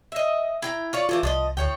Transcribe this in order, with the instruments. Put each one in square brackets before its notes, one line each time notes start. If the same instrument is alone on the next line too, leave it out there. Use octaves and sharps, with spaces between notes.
[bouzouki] D#5 E5
E4 G5 A#5
F4 C#5 D5
[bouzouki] A2 E3 G4 [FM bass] F4
[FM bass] C2 [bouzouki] F3 D5 D#5
[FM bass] D2 [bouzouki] A2 C#5 G5